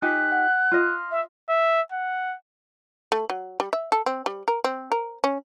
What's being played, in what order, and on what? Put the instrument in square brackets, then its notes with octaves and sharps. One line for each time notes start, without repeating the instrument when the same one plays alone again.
[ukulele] D#4 F4 G4 [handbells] G#5 B6 [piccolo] F#6
[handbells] F#5
[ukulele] F4 D#5 [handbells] C6 F6 A#6
[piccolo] E5
[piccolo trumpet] E5
F#5
[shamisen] A3
F#3
G3
E5
A4
C4
G3
A#4
C4
A#4
C#4